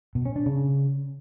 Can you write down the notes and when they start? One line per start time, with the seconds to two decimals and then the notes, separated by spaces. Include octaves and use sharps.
0.15 B2
0.25 C#4
0.36 D4
0.46 C#3